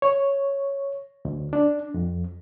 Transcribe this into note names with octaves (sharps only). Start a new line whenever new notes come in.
C#5
D2
D4
F2